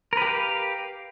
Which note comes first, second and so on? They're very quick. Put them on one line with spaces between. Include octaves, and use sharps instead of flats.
A#4 B4 G4 F5